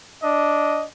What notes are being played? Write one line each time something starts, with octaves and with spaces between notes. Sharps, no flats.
D4 D#5